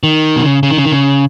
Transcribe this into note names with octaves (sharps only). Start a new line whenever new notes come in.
D#3
B2
C#3
C#3
D#3
C#3
D#3
C#3